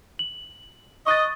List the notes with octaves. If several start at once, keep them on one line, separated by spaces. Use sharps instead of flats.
F#7
D#5 C#6 F#6 A6